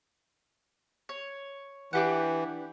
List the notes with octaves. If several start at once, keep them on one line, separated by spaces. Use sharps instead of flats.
C#5
E3 D4 G4 F#5